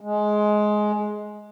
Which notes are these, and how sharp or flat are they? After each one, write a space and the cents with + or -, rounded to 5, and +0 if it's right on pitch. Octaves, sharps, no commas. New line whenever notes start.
G#3 +15